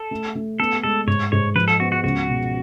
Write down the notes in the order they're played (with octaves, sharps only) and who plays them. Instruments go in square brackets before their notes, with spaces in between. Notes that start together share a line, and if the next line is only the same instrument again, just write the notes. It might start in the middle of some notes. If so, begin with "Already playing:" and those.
Already playing: [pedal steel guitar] A4
[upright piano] A3
A3
[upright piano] B3 [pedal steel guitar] A4
[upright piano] G#3 [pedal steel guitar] A4
[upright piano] G#2 [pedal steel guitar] C#5
[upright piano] G#2 [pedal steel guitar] C#5
[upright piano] F3 [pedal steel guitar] B4
[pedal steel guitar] A4
[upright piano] B3 [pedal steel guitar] F#4
[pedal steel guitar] F#4
[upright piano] C#2 [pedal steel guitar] F#4
[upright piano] B2